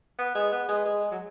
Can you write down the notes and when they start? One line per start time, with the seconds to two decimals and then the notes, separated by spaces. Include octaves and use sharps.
0.19 B3
0.35 G#3
0.52 B3
0.69 G#3
0.85 G#3
1.12 F#3